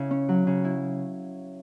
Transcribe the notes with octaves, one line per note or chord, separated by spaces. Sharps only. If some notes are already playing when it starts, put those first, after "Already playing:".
Already playing: C#3 E4
C#4
F#3
C#3
E4